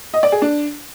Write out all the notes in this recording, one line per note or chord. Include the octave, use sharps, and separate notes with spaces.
D#5
D5
G#4
D4